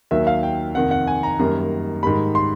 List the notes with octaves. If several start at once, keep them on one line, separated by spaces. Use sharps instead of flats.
D#2 D#3 F#3 A#3 E5
F5
G5
F2 C3 D#3 F#5
F#5
G#5
A#5
F#2 D#3 G3 A#3
G#2 D#3 G3 B5
C6